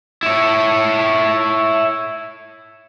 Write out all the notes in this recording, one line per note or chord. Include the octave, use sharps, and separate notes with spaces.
E4 C#5